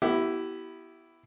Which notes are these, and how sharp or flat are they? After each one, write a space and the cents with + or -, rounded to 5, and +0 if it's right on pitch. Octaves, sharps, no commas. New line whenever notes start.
B3 +0 E4 +5 G4 -25